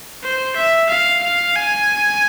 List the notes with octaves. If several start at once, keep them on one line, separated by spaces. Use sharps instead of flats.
C5
E5
F5
F5
G#5